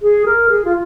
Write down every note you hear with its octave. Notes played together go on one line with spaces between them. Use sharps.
G#4
A#4
G#4
F4